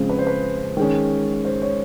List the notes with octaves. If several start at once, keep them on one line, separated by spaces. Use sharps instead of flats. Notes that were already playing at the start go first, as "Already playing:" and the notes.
Already playing: C#3 F3 G#3 C4
B4
C5
B4
D#3 G#3 C#4
C5
C#5